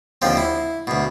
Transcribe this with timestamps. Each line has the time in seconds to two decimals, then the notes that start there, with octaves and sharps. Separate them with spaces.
0.22 D#2 D3 F3 C4
0.37 E4
0.87 D2 B2